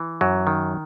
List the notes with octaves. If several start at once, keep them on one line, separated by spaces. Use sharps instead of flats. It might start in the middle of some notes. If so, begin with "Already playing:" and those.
Already playing: E3
F#2 F#3
D#3